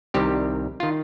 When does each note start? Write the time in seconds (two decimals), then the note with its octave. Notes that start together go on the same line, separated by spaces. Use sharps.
0.14 C2 C3 D#3 G3 C4 G4
0.80 D#3 F4